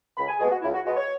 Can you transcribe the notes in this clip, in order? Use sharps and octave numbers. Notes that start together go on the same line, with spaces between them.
C#2 B5
G#5
B2 G#3 B3 G#4
F#4
C#2 E4
F#4
B2 G#3 B3 F#4
C#5